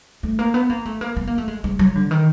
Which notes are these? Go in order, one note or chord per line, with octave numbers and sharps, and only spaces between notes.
A3
A#3
B3
A#3
A3
A#3
B3
A#3
A3
G#3
G#3
F#3
D3
D#3